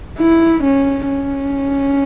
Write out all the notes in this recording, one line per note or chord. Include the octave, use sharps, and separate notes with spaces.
E4
C#4
C#4